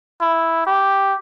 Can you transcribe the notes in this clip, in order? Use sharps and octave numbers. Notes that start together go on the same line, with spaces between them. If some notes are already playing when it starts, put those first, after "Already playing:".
E4
G4